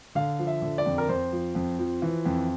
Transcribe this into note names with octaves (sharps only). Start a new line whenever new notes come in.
D3 F5
F3
E5
D3
D5
F2
A#4
F2 C5
F3
F2
F3
E3
F2